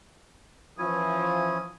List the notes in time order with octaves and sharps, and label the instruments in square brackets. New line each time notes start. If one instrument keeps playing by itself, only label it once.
[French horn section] E3 F3 [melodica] C#4 E4 C#5 [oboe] D#6